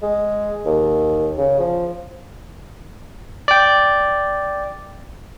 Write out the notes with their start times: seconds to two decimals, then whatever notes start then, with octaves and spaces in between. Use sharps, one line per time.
0.02 G#3
0.65 D#2
1.38 C#3
1.59 F3
3.48 D5 G5